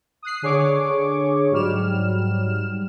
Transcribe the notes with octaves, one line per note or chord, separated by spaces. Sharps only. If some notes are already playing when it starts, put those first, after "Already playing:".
D#6 F#6 C7
D3 G#4 C#5 C#6 D6
G#2 F#3 G3 F6 E7